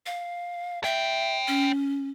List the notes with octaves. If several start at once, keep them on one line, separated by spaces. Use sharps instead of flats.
F5
C#5 E5 G5
C#4